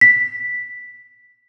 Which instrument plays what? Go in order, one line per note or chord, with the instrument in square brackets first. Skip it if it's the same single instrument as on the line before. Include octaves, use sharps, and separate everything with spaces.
[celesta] B6